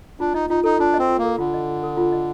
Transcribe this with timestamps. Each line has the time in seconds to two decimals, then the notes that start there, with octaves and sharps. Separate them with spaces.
0.20 D4 F4
0.34 D#4 D#5
0.50 D#4 F4
0.64 D#4 A4
0.79 D4 F4
0.94 D#5
0.99 C4
1.09 F4
1.18 A#3
1.24 A4
1.38 D3 F4
1.54 D#5
1.68 F4
1.83 A4
1.97 F4
2.12 D#5